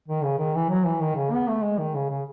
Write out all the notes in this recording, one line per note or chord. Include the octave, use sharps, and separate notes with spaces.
D#3
C#3
D#3
E3
F#3
E3
D#3
C#3
B3
A3
G#3
D#3
C#3
C#3